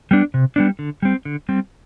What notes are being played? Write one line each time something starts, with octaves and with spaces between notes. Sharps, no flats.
G3 B3 D4
C3
G3 B3 D4
D3
G3 C4
D3
G3 C4